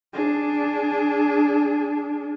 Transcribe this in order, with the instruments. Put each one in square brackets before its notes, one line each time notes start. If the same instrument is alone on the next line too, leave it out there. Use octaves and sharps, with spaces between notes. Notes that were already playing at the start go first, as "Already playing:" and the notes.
[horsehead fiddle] D4 G#4